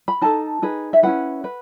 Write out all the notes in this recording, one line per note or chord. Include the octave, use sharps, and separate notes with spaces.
B5
D#4 A4 A5
D#4 G#4 B4
E5
C#4 E4 B4 F#5
B4